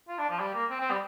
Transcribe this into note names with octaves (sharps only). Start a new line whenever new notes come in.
F4
D4
F3
G3
A#3
C4
C4
G3